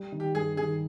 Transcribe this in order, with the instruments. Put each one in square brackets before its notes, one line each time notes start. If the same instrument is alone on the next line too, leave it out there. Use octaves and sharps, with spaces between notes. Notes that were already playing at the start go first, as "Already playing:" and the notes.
Already playing: [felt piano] G3
D#3
[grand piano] G4
[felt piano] G2 [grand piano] G#4
[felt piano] D#3 [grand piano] G#4